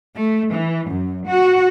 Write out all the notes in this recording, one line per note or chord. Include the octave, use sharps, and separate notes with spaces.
A3
E3
F#2
F#4